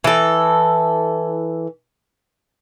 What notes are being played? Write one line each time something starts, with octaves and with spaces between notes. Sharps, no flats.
E3 A4